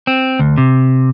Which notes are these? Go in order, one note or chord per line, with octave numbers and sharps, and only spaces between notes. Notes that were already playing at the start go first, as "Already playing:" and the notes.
C4
D2
C3